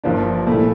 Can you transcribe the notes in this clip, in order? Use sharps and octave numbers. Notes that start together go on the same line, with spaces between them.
G1 G2 F3 A#3 D4
A#2 A3 E4